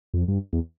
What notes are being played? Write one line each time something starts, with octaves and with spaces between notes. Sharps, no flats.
F2
G2
E2